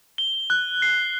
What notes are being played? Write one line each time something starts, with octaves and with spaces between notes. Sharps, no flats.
G7
F#6
C7